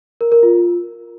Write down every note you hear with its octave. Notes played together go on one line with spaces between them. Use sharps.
A#4
A#4
F4